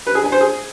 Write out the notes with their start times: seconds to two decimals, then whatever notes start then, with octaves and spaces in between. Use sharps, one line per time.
0.07 B4
0.15 G#4
0.24 G#5
0.32 C5
0.41 G#4